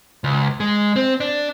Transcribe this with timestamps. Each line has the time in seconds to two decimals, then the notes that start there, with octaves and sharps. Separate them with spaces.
0.24 C#2
0.60 G#3
0.96 C4
1.20 D4